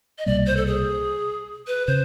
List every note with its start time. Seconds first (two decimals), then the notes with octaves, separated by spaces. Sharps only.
0.18 D#5
0.26 C2 B2 G3 A#3 D5
0.47 C5
0.57 A4
0.66 G#4
1.67 B4
1.87 C#3 C5